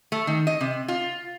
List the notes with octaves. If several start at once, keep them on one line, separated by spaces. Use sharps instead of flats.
A3
D#3
D#5
C3
F4